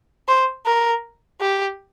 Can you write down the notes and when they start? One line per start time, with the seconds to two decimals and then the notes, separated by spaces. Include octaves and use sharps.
0.28 C5
0.66 A#4
1.41 G4